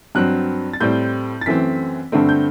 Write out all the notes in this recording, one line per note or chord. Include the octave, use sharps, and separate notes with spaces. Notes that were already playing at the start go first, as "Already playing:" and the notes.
G2 F#3 C4 F#6
A6
A2 G3 C4 G6
A6
F#2 E3 A3 C4 B6
G2 D3 A3 C4
G6